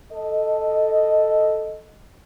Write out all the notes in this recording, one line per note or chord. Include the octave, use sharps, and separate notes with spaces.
A4 D#5